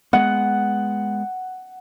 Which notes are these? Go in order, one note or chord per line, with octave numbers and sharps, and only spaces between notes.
G#3 B3 F#5